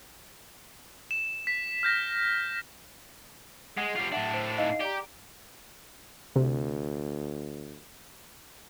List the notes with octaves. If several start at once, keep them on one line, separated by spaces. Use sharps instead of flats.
E7
B6
F6 G6 A#6
G#3 F#5
G3 F4
A2 D4 E5 F#5 A5
C5
D#4 D#5 F5
G4 D5 A#5
D2 C3